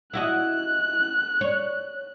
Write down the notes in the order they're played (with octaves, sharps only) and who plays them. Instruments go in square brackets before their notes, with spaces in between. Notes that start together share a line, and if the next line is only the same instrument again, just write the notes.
[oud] E4 F#4 D#5 [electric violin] F#6
[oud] C#5